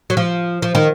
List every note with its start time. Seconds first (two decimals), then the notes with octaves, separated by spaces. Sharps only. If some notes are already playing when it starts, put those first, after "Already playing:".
0.10 F#3
0.17 F3
0.62 F3
0.75 D#3